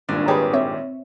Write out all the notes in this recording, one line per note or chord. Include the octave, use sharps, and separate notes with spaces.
G#1 G2 A#2 D4
D#3 G4 G#4 B4 C#5
C4 C#5 E5